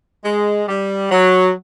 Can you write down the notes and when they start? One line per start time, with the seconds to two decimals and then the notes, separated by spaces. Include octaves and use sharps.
0.25 G#3
0.69 G3
1.11 F#3